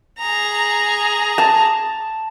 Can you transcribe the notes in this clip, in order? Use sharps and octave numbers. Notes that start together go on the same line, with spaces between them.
G#4 A#5
A5